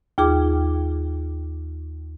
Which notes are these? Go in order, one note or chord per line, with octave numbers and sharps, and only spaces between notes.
D#2 F4 G#4 D6